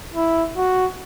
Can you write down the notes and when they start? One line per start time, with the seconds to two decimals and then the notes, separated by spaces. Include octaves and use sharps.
0.14 E4
0.57 F#4